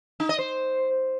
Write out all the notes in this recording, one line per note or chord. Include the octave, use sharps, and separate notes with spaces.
D#4
D#5
C5